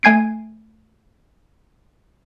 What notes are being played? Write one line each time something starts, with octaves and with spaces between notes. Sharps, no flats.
A3 G#5 G#6 C7 D7